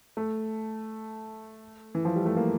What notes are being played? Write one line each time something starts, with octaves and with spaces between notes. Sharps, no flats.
A3
E3
F3
G3
A3
A#3